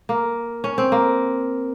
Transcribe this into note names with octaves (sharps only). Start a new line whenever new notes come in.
A#3
C#4
C4
A#3